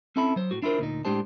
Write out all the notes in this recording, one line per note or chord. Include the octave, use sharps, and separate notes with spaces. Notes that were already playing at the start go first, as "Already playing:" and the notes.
C4 C#4 E4 A4 E5 B5
F#3 C5
A2 F#4
D4 E4 F4 A#4 C5
D2 A#2 D#4
A2 G#3 D4 G4 C5 A5